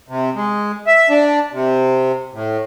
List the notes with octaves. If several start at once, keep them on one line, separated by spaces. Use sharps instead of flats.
C3
G#3
E5
D4
C3
A2